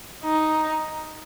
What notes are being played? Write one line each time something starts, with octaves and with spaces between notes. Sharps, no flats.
D#4